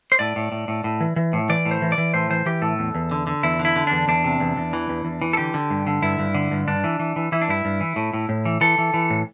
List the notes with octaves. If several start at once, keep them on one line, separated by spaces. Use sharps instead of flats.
C5
A2 D5
A2
A2
A2
A2
E3
E3
A2
E3 D5
A2
C5
E3
D5
E3
A2 C5
E3 C5
E3 G4
A2 A4
E2
E2
D3
D3
E2 E4
D3
E4
D3
E2 D4
E2 D4
C3
E2
E2
E3
E2
E2
E3
A4
D3 G4
D3
G2
D3
G2 E4
G2
D3
G2
G2 D4
E3
E3
E3
E3 E4
D4
G2 E4
G2
E3
A2
A2
A2
E3
E3 A4
E3
E3
A2